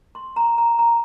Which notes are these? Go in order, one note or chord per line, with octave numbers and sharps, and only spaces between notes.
C6
A#5
A#5
A#5